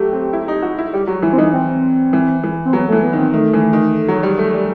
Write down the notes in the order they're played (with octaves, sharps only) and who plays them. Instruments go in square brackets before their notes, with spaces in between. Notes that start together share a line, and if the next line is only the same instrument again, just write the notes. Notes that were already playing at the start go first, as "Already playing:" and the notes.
Already playing: [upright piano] F#3 A3 [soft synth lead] G4
[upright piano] C4
E4
D#4
F#4
E4
[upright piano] G3 [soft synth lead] G4
[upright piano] F#3 [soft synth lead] F#4
[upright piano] E3 [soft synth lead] E4
[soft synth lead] C4
[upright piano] E3 [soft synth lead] D#4
[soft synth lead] C4
[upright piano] E3
E3
[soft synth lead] C4
[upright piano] F#3 [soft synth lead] B3
[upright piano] E3 [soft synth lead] A3
[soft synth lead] B3
[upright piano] D#3 [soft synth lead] C4
[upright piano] D#3 [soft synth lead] A3
[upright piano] E3
D#3
F#3
G3
A3
[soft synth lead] G3